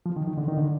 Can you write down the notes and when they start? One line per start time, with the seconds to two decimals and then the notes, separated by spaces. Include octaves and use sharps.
0.06 F3
0.16 D#3
0.27 D#3
0.38 D3
0.48 D#3
0.57 D3